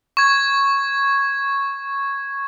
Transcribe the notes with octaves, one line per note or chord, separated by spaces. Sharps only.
C#6 G#6